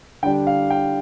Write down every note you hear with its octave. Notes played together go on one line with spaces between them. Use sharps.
D3 G3 D4 G5
F5
G5